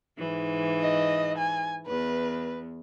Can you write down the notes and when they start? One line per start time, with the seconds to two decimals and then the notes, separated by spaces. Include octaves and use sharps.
0.18 G#2 E3
0.81 D#5
1.38 G#5
1.87 E2 B4